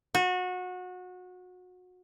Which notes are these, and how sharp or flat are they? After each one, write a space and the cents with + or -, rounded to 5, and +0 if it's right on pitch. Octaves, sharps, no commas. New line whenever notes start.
F#4 -25